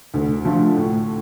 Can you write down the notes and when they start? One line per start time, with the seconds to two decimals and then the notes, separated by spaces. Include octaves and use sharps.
0.14 D2
0.45 D3 F3 A3
0.76 A2